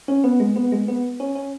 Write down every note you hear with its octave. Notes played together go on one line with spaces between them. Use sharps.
C#4
B3
G#3
B3
G#3
B3
C#4
C#4